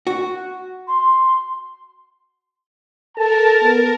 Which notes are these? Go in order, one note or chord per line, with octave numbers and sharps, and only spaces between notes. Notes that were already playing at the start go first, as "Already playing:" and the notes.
F#4
C6
A4 A#4 A5
B3